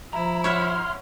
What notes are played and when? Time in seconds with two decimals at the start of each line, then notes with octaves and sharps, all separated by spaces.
0.13 F3 E4 A#5
0.44 C#5 E5 F#5 C6 F6